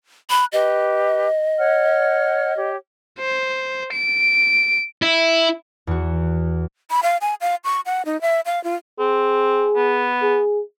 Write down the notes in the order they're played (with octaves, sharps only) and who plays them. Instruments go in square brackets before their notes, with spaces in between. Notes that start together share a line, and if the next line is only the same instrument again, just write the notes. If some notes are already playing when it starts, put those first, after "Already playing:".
[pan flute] B5 [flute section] F#6
[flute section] G4 B4 [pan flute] D#5
[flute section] C#5 F#5 F6
G4 C#5
[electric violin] C5
D7
[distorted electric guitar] E4
[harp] E2 F#4
[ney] B5
F5
G#5
F5
C#6
F#5
D#4
E5
F5
F4
[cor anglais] C4 [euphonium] G#4
[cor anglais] B3
[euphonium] G#4